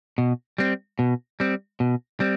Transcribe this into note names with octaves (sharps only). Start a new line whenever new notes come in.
B2
G3 C4
B2
G3 C4
B2
G3 C4